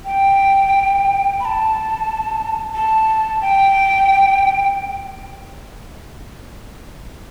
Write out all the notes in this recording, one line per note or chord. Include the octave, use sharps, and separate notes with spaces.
G5
B5
A5
A5
G5